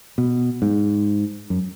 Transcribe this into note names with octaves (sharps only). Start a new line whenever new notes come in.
B2
G#2
F#2